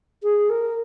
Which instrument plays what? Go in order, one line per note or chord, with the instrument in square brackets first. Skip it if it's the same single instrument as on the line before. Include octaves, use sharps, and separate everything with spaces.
[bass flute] G#4
A#4